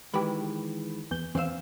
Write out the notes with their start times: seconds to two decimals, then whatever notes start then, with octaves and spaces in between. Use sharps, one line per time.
0.14 D#3 E3 G#3 G4 B4
1.11 E2 G6
1.35 E2 C4 F5 E6